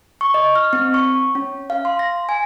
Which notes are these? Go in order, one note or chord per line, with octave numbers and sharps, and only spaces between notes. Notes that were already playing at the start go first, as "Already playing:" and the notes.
C#6
D#5
F6
C4
C#6
C#4
F5
C6
A#6
G#5